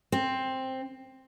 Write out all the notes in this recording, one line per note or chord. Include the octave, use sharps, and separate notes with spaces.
C4